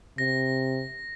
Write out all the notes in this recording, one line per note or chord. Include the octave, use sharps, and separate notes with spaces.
C3 A#6